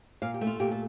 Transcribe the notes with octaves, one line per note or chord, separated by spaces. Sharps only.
A#2 F5
G4
A3
F4
A#2 G4
A4